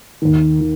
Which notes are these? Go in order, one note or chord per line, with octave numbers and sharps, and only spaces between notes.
D#2 D#3
D#3